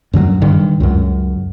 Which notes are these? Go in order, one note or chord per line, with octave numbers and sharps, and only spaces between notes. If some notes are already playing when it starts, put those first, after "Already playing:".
F#2 D3 E3 F#3
G2 D3 D#3
C#2 F#2